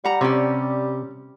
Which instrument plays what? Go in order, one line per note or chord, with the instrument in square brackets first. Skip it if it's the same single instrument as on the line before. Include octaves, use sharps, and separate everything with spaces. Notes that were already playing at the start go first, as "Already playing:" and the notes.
[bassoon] G3 [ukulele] F#5 A#5
[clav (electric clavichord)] C3 [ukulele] C#4 G4 D5